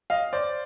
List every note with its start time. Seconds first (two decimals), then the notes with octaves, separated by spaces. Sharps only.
0.10 D#5 F5
0.33 C5 D5